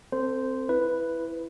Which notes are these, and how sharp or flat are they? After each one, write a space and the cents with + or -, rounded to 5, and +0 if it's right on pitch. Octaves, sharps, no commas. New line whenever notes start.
C4 +0 A4 +35 C5 -10
E4 +10 B4 +0